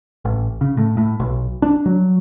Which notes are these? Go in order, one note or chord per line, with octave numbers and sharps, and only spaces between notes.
A1
C#3
A2
A2
B1
D4
F#3